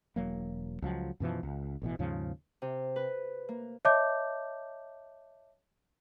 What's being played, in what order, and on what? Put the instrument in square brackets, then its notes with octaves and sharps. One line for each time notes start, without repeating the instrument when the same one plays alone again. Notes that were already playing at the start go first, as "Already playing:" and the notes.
[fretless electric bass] E1 F#3 A#3
C#2 F3 F#3
F#2 B2 E3 F3
C#2
A1 B2 E3
D#2 G#2 C#3 F3
[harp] C3
B4
A#3
[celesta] C#5 D#5 E5 A5 D6 G6